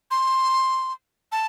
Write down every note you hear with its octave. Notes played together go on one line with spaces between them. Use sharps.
C6
A5